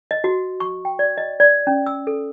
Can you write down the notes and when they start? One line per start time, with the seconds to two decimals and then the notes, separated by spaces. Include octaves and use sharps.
0.11 D#5
0.24 F#4
0.60 C#6
0.85 G5
0.99 D5
1.18 D#5
1.40 D5
1.67 C#4
1.86 E6
2.07 A4